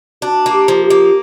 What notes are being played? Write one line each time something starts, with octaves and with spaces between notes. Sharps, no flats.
D4 F#4
A#3
G4
F3
G4
A#3